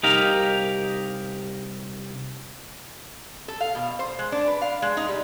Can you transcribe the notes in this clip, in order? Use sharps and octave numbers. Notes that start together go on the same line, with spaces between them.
C2 D#4 G4 A#4 F5
A4
F5
B2
C5
G#3
D4
B4
F5
G#3
D#4
G3